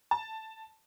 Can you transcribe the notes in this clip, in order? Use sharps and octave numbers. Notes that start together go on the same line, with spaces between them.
A5